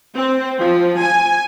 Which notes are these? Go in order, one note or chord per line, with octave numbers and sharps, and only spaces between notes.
C4
F3
G#5